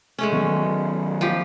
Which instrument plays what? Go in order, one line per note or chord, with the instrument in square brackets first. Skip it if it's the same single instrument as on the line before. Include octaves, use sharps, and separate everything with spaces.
[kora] G#3 A3 C#4
[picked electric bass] D#3 F#3 B3
[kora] F3 G4